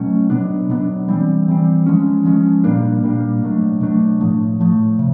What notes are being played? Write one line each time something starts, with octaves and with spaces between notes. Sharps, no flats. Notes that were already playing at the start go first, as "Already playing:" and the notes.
Already playing: B2 F#3 A3 C#4
B2 F#3 B3 D4
B2 F#3 B3 D4
E3 G3 C4
E3 G3 C4
F3 G#3 C#4
F3 G#3 C#4
A#2 G3 A#3 D4
A#2 G3 A#3 D4
B2 F#3 A3 D4
B2 F#3 A3 D4
A2 F3 A3
A2 F3 A3
C3